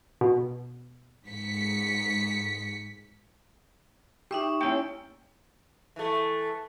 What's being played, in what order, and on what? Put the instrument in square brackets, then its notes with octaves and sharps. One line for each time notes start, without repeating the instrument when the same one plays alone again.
[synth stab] B2
[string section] G#2 B6 C#7
[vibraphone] D#4 E5 C#6 [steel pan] G4
[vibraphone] A#3 E4 [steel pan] C#4 G5
[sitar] E3 A3